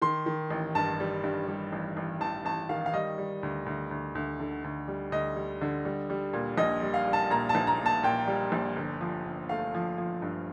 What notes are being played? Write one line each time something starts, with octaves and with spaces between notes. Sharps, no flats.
D#3 C6
D#3
A1
G2 A5
G3
G2
G3
A1
A1
A1 A5
A1 A5
D#3 F5
F5
G3 D#5
G3
D2
D2
D2
D2
D3
D2
G3
D2 D#5
G3
D3
G3
G3
A#2
A#1 D#5
G3
F5
G3
A5
A#2 A#5
A5
A#1
A#5
A#2
A5
A#2 G5
G3
A#1
G1
F3
G1
A3 F5
F3
F3
G2